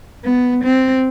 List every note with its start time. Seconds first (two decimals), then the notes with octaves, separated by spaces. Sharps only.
0.23 B3
0.63 C4